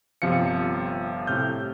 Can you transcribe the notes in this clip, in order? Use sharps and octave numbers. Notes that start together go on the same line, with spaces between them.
G1 C3 F3 F5 C#7
A2 C3 F6 G6